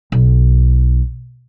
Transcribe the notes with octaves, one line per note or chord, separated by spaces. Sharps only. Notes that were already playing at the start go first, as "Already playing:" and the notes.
B1